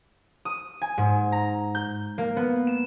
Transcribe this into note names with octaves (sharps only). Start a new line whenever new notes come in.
D#6
G#5
G#2
A#5
G6
A#3
B3
E7